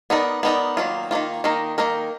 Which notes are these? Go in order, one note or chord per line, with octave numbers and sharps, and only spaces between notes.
B3 D#4 A#4 D5
B3 D#4 A#4 D5
D#3 F#3 A#3 F4
D#3 F#3 A#3 F4
D#3 A#3 D#4 A#4
D#3 A#3 D#4 A#4